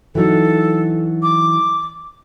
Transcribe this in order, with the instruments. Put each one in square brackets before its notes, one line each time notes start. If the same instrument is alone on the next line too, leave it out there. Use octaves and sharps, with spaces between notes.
[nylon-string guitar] E3 F#3 D#4 [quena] A4
[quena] D6